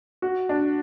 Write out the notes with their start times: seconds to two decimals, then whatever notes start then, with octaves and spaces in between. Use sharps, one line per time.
0.22 F#4
0.49 D4